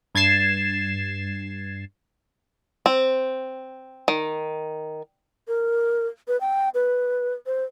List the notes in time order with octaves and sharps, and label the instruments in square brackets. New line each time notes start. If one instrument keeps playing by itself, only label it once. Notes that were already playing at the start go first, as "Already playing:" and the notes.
[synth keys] G2 G#6 A6 C7 E7
[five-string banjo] C4
D#3
[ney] A#4
B4
G5
B4
C5